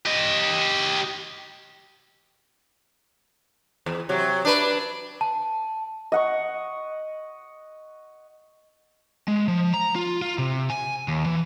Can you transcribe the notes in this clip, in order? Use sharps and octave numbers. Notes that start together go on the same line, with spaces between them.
G4 D#5
E2
C3 F#3
D4 B4
A5
D#5 F#5 C#6
G#3
F3
A#5
F4
F4
C3
G#5
D#2
E3